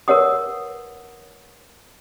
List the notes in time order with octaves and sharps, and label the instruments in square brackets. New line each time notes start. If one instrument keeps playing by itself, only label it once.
[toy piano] A#4 B4 C#5 F#5 D#6